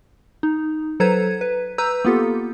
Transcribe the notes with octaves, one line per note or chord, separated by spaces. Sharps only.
D#4
F#3 A4 B4 C5 A#5 G#6
B4
B4 A#5 E6 G6
A#3 B3 F4 G4 A4